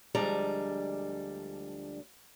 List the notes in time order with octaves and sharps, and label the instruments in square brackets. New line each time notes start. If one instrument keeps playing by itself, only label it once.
[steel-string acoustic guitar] D2 F3 G3 G#3 D4 A#5